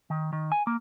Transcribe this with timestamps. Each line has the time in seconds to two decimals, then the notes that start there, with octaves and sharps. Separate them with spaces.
0.10 D#3
0.33 D#3
0.52 G#5
0.67 A#3